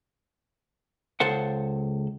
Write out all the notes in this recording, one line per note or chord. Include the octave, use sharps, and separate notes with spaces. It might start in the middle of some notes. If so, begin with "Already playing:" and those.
C#2 A4 C5 F#5